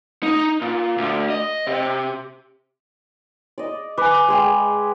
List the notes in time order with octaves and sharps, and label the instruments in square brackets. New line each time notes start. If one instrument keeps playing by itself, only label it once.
[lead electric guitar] D#4
A#2
D2
D#5
C3
[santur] D5 D#5
[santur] B4 [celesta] G#5 D6
[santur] G#3 G#4 G5